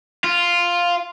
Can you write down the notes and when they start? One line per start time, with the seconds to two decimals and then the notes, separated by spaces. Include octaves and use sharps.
0.24 F4